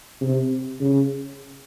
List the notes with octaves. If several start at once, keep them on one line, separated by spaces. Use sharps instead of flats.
C3
C#3